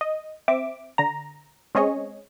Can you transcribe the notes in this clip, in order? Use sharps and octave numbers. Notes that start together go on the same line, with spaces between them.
D#5
C4 E5 D6
D3 A#5
G#3 C4 C#4 G#4 C#5 D#5